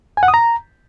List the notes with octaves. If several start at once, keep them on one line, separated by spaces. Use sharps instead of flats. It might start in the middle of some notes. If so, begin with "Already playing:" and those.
G#5
F#5
D#6
A#5